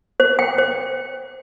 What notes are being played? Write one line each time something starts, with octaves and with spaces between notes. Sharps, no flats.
C5
G5
C5